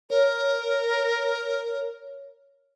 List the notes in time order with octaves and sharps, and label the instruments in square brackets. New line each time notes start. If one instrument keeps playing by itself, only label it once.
[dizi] A#4 [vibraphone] C#5